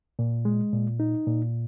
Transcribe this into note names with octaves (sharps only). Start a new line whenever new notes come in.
A#2
G#3
A#2
D#4
A#2